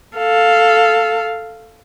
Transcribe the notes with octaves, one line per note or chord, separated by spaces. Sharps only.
A4 F5